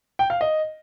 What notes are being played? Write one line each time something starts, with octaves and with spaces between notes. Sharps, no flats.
G5
F5
D#5